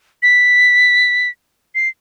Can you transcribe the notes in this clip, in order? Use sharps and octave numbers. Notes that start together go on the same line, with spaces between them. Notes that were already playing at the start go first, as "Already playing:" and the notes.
B6
C7